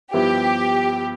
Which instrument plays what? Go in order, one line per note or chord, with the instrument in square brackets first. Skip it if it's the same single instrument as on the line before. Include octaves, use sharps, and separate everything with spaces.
[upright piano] G2 F3 B3 E4 [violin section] G4